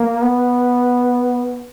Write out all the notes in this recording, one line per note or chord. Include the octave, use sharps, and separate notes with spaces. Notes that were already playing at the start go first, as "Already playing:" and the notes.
Already playing: A#3
B3